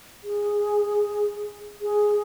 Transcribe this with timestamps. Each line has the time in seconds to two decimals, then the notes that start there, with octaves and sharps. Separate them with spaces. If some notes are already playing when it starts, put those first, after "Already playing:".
0.24 G#4
1.82 G#4